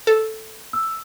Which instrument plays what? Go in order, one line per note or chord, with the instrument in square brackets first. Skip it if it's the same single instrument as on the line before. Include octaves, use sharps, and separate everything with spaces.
[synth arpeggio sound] A4
[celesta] E6